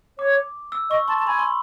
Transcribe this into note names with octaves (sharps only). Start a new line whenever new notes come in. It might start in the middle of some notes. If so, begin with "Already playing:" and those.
C#5 D6
E6
D#5 C#6
A5 C6
A5
G#5 B5
C6